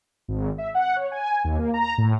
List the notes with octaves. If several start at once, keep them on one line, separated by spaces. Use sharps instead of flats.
G#1
E5
F#5
C#5
G#5
D#2
A#3
A#5
A2